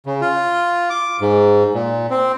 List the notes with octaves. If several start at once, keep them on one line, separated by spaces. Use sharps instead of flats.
C#3
F4
D6
G#2
A#2
C4